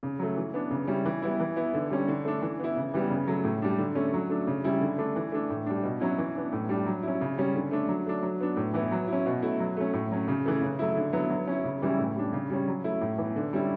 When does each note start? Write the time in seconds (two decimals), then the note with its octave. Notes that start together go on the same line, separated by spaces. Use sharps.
0.03 C#3
0.19 F#3 A3
0.37 E3
0.54 B3 D4
0.71 C#3
0.87 G3 C#4 E4
1.05 E3
1.22 G3 B3 E4
1.40 E3
1.56 B3 E4
1.74 D3
1.90 G3 C#4
2.08 D3
2.25 A3 D4
2.42 E3
2.60 B3 E4
2.76 C#3
2.94 E3 G3 B3
3.10 C#3
3.27 F#3 A3
3.44 A2
3.62 G3 D4
3.78 D3
3.95 A3 C#4
4.13 F#3
4.30 A3 D4
4.47 C#3
4.64 G3 C#4 E4
4.81 D3
4.98 A3 D4
5.16 E3
5.32 A3 D4
5.50 A2
5.66 G3 D4
5.83 B2
6.00 F#3 C#4 E4
6.18 E3
6.35 B3 D4
6.53 A2
6.69 G3 D4
6.86 F#3
7.03 C#4 E4
7.21 C#3
7.38 G3 C#4
7.55 D3
7.71 A3 D4
7.88 F#3
8.06 A3 D4
8.22 F#3
8.40 B3 D4
8.56 A2
8.74 E3 B3 E4
8.91 F#3
9.08 C#4 E4
9.26 B2
9.43 A3 E4
9.60 F#3
9.77 A3 C#4
9.93 A2
10.11 F#3 C#4
10.28 C#3
10.46 E3 A3
10.61 C#3
10.79 F#3 A3 E4
10.97 D3
11.13 F#3 B3 E4
11.30 F#3
11.47 C#4 E4
11.64 C#3
11.82 E3 G3 C#4 E4
11.98 A2
12.16 G3 D4
12.33 C#3
12.50 G3 C#4
12.68 F#3
12.84 A3 E4
13.01 A2
13.18 E3 B3
13.36 D3
13.53 G3 C#4 E4